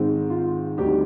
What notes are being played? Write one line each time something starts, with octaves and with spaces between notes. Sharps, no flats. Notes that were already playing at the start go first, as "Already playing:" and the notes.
Already playing: G#2 D#3 G#3 C4 D#4
F4
D2 D3 G3 C4 D#4 G4